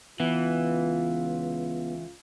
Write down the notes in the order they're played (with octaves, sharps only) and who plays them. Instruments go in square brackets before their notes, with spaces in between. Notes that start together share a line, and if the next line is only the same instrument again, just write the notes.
[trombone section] C#2 F4 [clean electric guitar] E3 [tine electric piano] B3